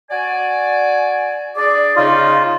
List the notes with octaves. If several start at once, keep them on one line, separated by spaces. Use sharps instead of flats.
F#4 D5 G#5
D4 G#4 D5
C#3 D#4 F4